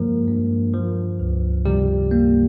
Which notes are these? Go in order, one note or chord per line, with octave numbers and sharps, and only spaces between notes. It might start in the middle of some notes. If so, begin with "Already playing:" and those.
Already playing: G2 F3 G#3 A#3 A#4
G2
F3
C#2
C3 G3 G4
A#3